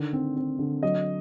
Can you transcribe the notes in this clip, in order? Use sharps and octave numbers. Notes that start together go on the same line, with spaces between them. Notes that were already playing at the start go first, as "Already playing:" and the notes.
Already playing: D3 D#3
C4
C4
D3
F#3 D#5